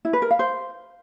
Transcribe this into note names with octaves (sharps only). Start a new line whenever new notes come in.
E4
B4
A#4
F5
C5